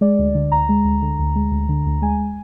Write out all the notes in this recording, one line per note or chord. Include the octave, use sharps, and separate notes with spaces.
G#3 D5
D2
D3
D2 A#5
G#3
D2
D3
D2
G#3
D2
D3
D2
G#3 G#5